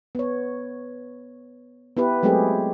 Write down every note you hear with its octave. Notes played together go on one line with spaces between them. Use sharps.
B3 C#5
B3 E4 G4 B4
F#3 G#3 A3 C4 G4 G#4